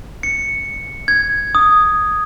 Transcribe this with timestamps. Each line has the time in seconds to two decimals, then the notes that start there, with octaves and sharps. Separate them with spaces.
0.23 C#7
1.08 G#6
1.55 D#6